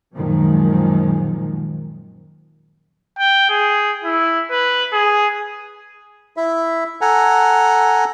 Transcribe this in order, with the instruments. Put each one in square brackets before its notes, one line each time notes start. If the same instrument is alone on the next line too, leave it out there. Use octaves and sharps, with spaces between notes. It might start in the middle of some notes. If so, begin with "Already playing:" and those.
[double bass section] F#2 A#2 D#3 F3 G#3
[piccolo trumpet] G5
G#4
E4
B4
G#4
[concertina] E4 E5
A4 F#5 G#5 A#5